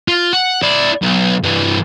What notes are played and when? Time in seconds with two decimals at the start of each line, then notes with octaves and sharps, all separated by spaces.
0.08 F4
0.33 F#5
0.62 E4 D5
1.02 B1
1.43 G2 E3